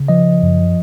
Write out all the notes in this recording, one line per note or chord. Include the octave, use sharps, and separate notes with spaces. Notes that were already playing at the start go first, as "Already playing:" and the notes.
Already playing: C#3
F3 D#5
F#2